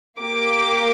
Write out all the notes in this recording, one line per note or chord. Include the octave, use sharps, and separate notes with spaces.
A#3 G4 D6